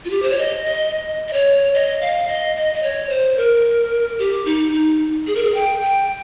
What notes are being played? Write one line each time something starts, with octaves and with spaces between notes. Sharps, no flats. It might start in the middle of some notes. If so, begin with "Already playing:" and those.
F4
G4
C5
C#5
D#5
D#5
D#5
C#5
D#5
F5
D#5
D#5
D#5
C#5
C5
A#4
G4
D#4
D#4
G#4
A#4
G#4
G5
G5